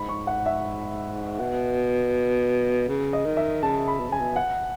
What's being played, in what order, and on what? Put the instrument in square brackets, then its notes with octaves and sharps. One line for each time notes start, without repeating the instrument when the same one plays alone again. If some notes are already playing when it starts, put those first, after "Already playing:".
Already playing: [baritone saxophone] G#2 [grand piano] B5
[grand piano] C#6
F#5
E5
[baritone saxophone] B2 [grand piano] F#5
[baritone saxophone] C#3
[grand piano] D#5
[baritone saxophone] D#3
[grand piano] E5
[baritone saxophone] C#3 [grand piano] A5
[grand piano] B5
[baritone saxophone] B2
[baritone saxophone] C#3 [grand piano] G#5
[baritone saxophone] B2
[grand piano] F#5